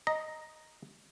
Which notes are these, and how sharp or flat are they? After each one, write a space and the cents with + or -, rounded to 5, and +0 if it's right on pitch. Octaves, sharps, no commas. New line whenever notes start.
D#5 +0 A#5 +0